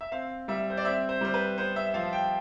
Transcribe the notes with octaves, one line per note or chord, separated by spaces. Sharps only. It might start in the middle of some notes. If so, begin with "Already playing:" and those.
E5
C4 F5
G3 E5
C5
D5
C4 E5
C5
G3 C5
B4
B3 C5
E5
F3 F5
G5